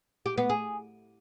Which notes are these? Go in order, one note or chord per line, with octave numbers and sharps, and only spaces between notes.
G4
B3
G#4